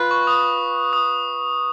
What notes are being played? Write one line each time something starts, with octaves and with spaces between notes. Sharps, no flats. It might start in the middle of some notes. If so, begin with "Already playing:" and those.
Already playing: F4 B4
C#6
D#6
D#6